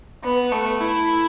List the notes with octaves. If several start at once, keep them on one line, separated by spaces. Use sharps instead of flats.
B3
A3
E4